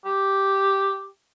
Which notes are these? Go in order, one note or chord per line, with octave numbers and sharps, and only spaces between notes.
G4